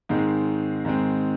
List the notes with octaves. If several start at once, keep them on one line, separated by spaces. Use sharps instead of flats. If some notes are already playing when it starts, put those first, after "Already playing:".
G#2 D#3 G#3 C4
G#2 D#3 G#3 C4